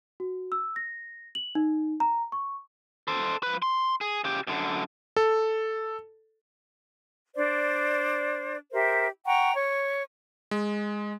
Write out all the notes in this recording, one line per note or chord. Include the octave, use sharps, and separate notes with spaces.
F#4
E6
A#6
F#7
D#4
A#5
C#6
A4 C5
F3 B4
C6
G#4
C#3 G4
F#2 D3
A4
D4 C5 D5
G4 A#4 C5 E5
F#5 G5 A#5 C#6
C#5 C#6
G#3